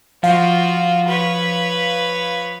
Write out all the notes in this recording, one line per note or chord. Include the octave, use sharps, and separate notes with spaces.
F3 F4 F#4 F5
B4 C#5